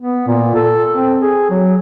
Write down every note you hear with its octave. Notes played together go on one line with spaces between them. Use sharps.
B3
A#2
A4
C4
G#4
F#3